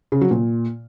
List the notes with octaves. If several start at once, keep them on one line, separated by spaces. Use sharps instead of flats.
C#3
F#3
A#2